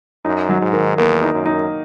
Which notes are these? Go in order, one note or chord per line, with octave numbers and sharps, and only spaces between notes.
F#2 D#4
F#3
G#2
D#3
E2 A#3
D#4
F#2
D#4